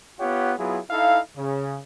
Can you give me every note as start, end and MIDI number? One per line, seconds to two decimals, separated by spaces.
0.19 0.53 59
0.19 0.53 65
0.19 0.53 67
0.19 0.53 73
0.19 0.53 78
0.58 0.78 54
0.58 0.78 59
0.58 0.78 64
0.58 0.78 65
0.58 0.78 68
0.90 1.19 63
0.90 1.19 64
0.90 1.19 69
0.90 1.19 77
1.36 1.78 49